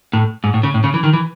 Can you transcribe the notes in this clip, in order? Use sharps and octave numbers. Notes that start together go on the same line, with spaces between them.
A2
G#2
A2
C#3
A2
C#3
E3
D#3
E3